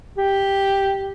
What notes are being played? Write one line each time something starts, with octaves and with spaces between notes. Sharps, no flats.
G4